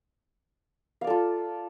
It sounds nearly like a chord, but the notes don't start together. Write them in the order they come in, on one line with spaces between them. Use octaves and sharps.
F5 D5 A4 F4